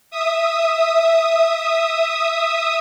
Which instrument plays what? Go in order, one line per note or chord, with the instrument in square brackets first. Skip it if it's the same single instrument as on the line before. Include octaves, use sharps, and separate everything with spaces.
[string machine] E5 D#6